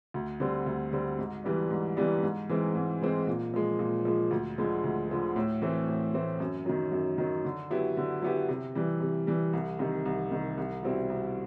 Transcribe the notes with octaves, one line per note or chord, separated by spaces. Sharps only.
D2
D3 G3 C4
D2
D3 G3 C4
G#2
E3 G3 B3 D4
G#2
E3 G3 B3 D4
G#2
E3 G#3 C4
G#2
E3 G#3 C4
A#2
F3 G#3
A#2
F3 G#3
D2
D3 F3 G#3
D2
D3 F3 G#3
A2
E3 A3 C4
A2
E3 A3 C4
F#2
D#3 F#3
F#2
D#3 F#3
D3
F#3 B3 E4 G4
D3
F#3 B3 E4 G4
C3
E3 G3
C3
E3 G3
C2
C3 D#3
C2
C3 D#3
C2
B2 G3 C4 E4
C2